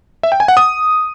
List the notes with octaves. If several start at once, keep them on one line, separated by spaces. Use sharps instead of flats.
E5
G5
G#5
F#5
D#6